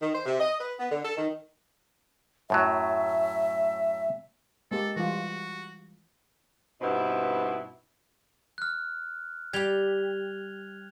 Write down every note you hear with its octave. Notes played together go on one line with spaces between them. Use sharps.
D#3
C5
C3
D#5
B4
B3
D3
A4
D#3
F#2 A2 F#3 E5
G#3 A#3 G4 A4
E3 G3 F4 F#4
G2 B2 B3 C4 D#4 E4
F6 F#6
G3 G4 G#6 F7 G7